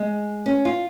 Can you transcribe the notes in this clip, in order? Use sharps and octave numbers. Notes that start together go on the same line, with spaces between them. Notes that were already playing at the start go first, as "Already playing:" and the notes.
Already playing: G#3
C#4
F4